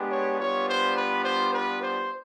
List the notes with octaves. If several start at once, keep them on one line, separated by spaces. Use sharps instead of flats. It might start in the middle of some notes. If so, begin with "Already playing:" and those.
Already playing: G#3 B3 D4 G4
C#5
G3 B3 D4 F4 C#5
C5
B4
C5
B4
C5